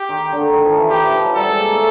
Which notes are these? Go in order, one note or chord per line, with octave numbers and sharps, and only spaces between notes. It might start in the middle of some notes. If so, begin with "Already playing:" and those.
Already playing: G4
D#3
D3
D#3
D#3
F3
E3
D#3 G4
E3
F3
F#3
G3 A4
G#3
A#3
A3